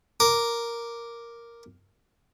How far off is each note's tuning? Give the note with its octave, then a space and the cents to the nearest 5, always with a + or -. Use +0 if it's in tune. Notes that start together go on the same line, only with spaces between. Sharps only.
A#4 +0 D6 +0